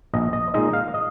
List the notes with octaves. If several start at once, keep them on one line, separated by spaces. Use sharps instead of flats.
A#1 D#5
D#5
A#2 G#3 D#4 D#5
F5
D#5